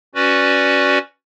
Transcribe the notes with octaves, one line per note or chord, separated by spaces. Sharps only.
C#4 F#4 B4 D5